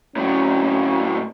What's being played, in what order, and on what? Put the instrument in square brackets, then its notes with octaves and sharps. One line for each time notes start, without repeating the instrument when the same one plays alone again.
[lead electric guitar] A2 F#3 [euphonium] C#4